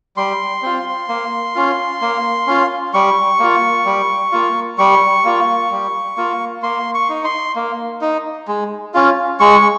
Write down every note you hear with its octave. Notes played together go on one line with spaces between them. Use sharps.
G3 C6
C4 F4
A#3
C#4 F4
A#3
C#4 F4
G3 C#6
A#3 F4
G3
A#3 F4
G3 C#6
A#3 F4
G3
A#3 F4
A#3 C6
C#6
D#4
C6
A#3
D#4
G#3
C#4 F4
G#3 C#6